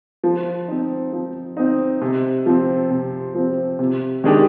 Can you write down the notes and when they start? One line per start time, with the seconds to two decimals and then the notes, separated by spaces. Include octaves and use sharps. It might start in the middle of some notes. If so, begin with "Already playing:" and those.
0.24 F3
0.68 C4 D#4
1.13 F3
1.57 C4 D#4
2.02 C3
2.46 F3 C4
2.91 C3
3.34 F3 C4
3.79 C3
4.24 D#3 G#3 D4 G4